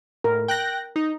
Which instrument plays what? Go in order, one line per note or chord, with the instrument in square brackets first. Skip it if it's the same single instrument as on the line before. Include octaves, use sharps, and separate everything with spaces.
[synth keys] A2 [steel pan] A#4
[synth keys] G5 F#6 A#6
D#4